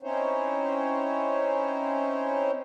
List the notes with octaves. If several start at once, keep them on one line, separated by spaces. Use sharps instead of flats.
C4 C#4 D#4 E4 C5 C#5